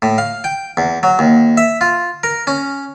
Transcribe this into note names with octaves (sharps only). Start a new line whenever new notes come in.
A2
F5
G5
E2
F#3
D#2
E5
F4
A#4
C#4